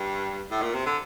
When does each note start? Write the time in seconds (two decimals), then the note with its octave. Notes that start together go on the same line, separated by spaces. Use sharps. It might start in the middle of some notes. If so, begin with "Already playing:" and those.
Already playing: G2
0.51 A2
0.62 A#2
0.74 C3
0.86 D3